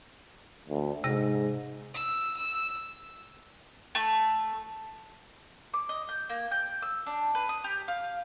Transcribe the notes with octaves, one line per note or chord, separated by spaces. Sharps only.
D2
G#2 C3 G5 A#6
E6
E6
A3
D6
D#5
G6
A#3
G5
E6
D4
B4
D#6
G4
F5